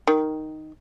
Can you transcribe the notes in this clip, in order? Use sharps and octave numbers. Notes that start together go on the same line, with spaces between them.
D#3